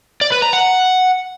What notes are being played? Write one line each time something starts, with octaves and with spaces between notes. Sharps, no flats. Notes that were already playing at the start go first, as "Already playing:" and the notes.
D5
B4
A#5
F#5